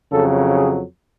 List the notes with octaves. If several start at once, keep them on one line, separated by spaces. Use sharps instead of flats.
F2 C#3 F#3 A4
G#4